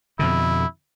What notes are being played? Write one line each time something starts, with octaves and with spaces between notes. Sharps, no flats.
F2 B2 D3 E4